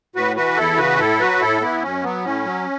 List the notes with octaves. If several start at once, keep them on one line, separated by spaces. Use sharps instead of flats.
A2 F#4 B4
E3 F#4 B4
E2 E4 A4
C#3 E3 F#4 B4
A2 E4 A4
F#3 F#4 B4
A2 E4 A4
E3 B3 E4
F#2 C#4
F#3 B3
A2 C#4
F#3